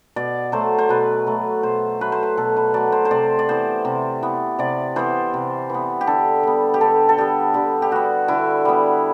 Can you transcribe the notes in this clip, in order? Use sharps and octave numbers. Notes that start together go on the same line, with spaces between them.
B2 D5
F#3 A3 C5
C5
B2 B4
F#3 A3
B2 C5
F#3 A3 B4
C5
B4
B2 A4
B4
F#3 A3 D5
C5
C5
C3 D5
D5
E3 B3 C5
C3
E3 B3
C3 D5
E3 B3 C5
C3
E3 B3
G4
D3 A4
G3 B3
G4
D3 A4
A4
G3 B3 G4
D3 G4
G4
G3 B3 F#4
D3 E4
G3 B3